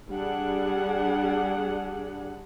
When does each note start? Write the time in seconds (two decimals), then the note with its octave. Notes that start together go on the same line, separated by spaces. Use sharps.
0.11 G3 D4 G#4 F#5